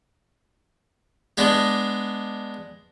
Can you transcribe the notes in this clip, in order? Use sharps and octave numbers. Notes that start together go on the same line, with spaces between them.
G#3 B3 D4